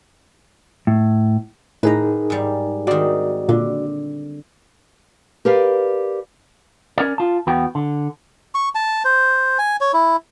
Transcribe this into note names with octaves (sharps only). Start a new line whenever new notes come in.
A2
A2 D#4 G#4 A#4 B4 A#5
G#2 G3
D#3 C4 F#4 D5
A#2 D3
G4 A#4 B4 D5 F5
C#4 A#4 D5
F4 A5
E2 B3 F#4 G5
D3
C#6
A5
C5
G#5
C#5
E4